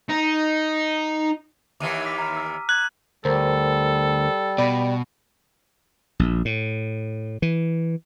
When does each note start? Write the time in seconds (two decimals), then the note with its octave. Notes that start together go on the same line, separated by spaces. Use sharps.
0.09 D#4
1.80 D#2 D#3 E3 D6 D#7
2.06 D6 B6
2.19 A#5 F6
2.37 E6
2.69 F#6 G#6 F#7
3.25 D2 G3 A4 A#4 C5
4.58 B2 D5 B5
6.19 A#1
6.45 A2
7.42 E3